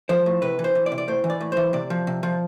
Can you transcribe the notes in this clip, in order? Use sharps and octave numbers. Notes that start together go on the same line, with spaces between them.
F3 C5
A2
C3 B4
E3
C5
E3
D5
C3
D5
A2 C5
E3
D5
A2
E3 C5
C3 D5
F3
C3
F3